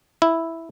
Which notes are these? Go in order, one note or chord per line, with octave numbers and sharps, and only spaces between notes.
E4